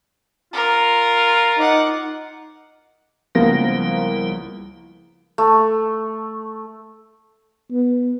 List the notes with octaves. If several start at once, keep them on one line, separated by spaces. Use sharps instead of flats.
F4 A#4
D#4 F#5 D6
C#2 F3 G3 A#3 B3 E4 A#6
A3
B3